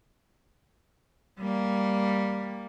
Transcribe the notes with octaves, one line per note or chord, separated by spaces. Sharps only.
G3 A#3